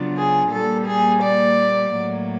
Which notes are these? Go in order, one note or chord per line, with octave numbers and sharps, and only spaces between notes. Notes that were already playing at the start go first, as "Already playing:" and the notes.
Already playing: C#3 F#3 B3 D4 F4
G#4
A#2 G3 A#3 A4
G#4
D5
A2 F#3 A#3